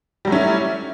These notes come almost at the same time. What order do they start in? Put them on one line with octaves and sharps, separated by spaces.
G3 F#3 A3 C#4 E4